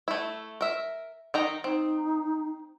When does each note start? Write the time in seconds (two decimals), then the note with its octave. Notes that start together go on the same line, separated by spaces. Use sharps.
0.08 A3 E4
0.61 A#4 E5
1.34 D#3 D#4 A#5
1.64 C4 D#4